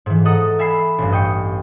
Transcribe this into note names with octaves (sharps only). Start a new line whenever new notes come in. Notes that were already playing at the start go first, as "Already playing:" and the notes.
G#2 E3
A4 D#5 F#5 A#5 D#6
E5 G#5 B5 E6 C7
A1 G2
D#5 G5 C#6